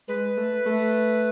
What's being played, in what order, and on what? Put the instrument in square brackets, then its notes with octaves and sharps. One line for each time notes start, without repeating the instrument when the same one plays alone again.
[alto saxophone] G#3 [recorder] B4
[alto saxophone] A3
A3